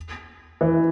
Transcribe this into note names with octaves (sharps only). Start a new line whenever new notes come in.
E3